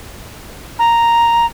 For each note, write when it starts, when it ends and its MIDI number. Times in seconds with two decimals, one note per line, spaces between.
0.78 1.45 82